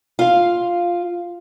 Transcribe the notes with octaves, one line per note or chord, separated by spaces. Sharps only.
F4 F5